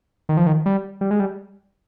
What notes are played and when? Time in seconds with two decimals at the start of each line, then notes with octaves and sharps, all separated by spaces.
0.29 D#3
0.37 F3
0.46 D#3
0.66 G3
1.01 G3
1.11 G#3
1.20 G3